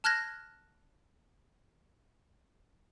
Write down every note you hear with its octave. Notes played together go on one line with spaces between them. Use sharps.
A5 F6 F#6 G#6 A#6